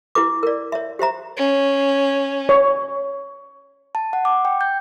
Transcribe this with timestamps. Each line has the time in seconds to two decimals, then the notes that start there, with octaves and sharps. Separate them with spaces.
0.15 E4 G4 B4 D6
0.43 A#4 D5
0.72 C#5 E5
0.99 G4 C5 E5 A#5
1.37 C#4
2.49 C#5
3.95 A5
4.13 F#5
4.25 D6
4.45 G5
4.61 G6